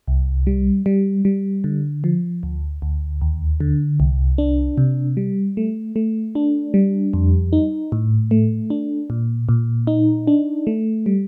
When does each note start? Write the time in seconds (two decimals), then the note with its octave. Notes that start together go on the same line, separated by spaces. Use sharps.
0.08 C2
0.47 G3
0.86 G3
1.25 G3
1.64 D3
2.04 F3
2.43 D2
2.82 D2
3.21 D#2
3.60 D3
4.00 C2
4.38 D4
4.78 C3
5.17 G3
5.57 A3
5.96 A3
6.35 D4
6.74 G3
7.13 F2
7.53 D#4
7.92 A2
8.31 A3
8.70 D4
9.10 A#2
9.49 A#2
9.87 D#4
10.27 D4
10.67 A3
11.06 G3